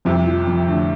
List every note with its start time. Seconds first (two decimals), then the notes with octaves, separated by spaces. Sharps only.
0.05 C2 F2 C3
0.27 F3
0.47 F2
0.68 A2 D3